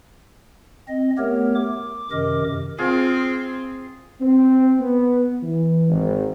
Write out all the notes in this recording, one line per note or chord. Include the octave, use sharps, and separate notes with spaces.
C4 D#5
A3 B3 G4 A#4 C#5
D6
F#2 C3 D#3 A#4 D#5 D6
C4 F4 G#4
C4
B3
E3
G#1